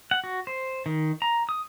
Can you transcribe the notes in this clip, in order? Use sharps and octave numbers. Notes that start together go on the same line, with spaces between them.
F#5
F#4
C5
D#3
A#5
D#6